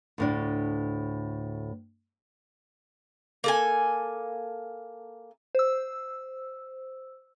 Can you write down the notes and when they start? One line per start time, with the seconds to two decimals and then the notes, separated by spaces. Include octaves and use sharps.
0.18 D2 A2 D4
3.44 A#3 A4 G#5
5.55 C5 E6